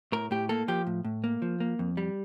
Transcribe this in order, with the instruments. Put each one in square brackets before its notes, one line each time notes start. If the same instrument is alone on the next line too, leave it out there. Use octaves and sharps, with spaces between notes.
[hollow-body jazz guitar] A2 A#4
A2 G4
A#3 A4
F3 G4
A2
A2
A#3
F3
A#3
F2
G3